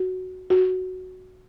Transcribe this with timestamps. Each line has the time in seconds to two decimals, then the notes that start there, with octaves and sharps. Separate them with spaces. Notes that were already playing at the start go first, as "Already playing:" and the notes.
Already playing: F#4
0.50 F#4